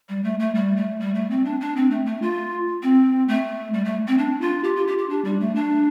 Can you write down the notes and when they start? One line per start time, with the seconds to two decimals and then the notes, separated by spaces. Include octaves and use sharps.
0.09 G3
0.24 A3
0.39 A3
0.55 G3
0.77 A3
1.00 G3
1.15 A3
1.30 C4
1.45 D4
1.61 D4
1.76 C4
1.91 A3
2.06 A3
2.22 F4
2.83 C4
3.28 A3
3.74 G3
3.85 A3
4.08 C4
4.18 D4
4.41 F4
4.64 G4
4.76 F4
4.87 G4
4.98 G4
5.09 D4
5.25 G3
5.40 A3
5.55 D4